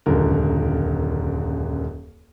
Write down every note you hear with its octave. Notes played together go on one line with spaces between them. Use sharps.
D#1 C#2 F#2 D3 A#4